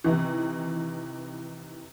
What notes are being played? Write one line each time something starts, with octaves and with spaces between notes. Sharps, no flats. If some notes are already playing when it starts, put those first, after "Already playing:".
C3 D#3 E3